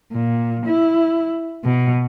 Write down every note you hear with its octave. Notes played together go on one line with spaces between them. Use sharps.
A#2
E4
B2